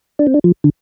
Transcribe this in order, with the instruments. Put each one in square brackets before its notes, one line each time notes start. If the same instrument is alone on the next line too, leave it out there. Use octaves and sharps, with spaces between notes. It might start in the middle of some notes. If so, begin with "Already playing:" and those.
[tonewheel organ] D4
C4
D4
F3
D3